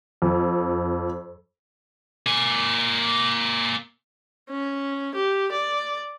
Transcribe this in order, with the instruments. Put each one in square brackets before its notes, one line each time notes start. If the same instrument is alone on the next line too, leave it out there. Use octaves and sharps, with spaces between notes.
[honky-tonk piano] F2
[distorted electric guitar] A#3 G#5
[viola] C#4
G4
D5